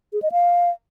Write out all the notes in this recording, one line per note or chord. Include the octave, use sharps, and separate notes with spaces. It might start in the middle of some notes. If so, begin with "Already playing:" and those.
G#4
D#5
F5